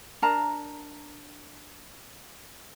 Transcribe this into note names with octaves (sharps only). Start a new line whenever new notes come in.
D4 A#4 A5 A#5